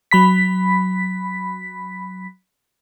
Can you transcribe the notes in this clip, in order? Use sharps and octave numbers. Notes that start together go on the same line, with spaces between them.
F#3 B5 B6